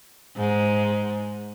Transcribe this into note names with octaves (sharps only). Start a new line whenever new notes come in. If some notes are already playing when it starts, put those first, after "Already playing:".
G#2